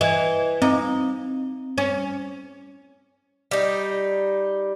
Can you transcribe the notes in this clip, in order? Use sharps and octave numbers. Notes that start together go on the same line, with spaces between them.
E3 D#5
C4 D#4
C#4
G3 D#4